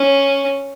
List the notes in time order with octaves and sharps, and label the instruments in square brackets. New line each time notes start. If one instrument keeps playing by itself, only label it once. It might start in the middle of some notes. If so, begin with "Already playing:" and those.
Already playing: [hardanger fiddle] C#4